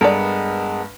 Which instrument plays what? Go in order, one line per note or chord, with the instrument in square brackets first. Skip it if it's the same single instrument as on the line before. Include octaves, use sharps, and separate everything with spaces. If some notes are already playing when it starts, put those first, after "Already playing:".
[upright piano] G2 [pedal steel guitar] G#3 B3 A#4 [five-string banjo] A4 D5